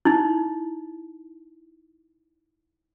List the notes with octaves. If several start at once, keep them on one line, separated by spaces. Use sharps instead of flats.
D#4 E4